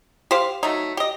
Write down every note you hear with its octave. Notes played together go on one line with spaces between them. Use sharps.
G4 C5 F5
F#3 A3 D#4
G4 D#5